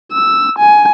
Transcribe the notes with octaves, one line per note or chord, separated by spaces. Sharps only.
E6
G#5